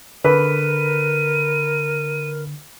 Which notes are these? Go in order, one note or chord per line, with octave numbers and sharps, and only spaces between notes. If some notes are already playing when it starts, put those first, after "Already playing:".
D3 A#4 B4 D#7